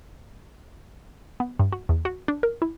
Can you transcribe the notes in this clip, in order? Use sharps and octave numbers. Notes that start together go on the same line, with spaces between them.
B3
G2
F#4
E2
F#4
D4
A#4
E4